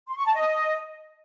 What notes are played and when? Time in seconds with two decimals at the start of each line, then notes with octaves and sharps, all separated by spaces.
0.08 C6
0.17 C#6
0.26 A5
0.35 D#5